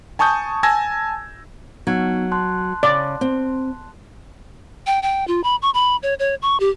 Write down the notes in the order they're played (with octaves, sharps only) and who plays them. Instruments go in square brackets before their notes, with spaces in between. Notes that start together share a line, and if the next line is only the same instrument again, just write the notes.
[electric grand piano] G#5 A5 C#6 D#6 G6
G#5 A5 E6 G#6 A#6
[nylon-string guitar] F#3 [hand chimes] B3 D#4 G#6
[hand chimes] A5 C6 F#6
[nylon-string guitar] C#3 [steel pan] D5
[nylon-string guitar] C4
[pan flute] G5
G5
F4
B5
C#6
B5
C#5
C#5
C#6
G4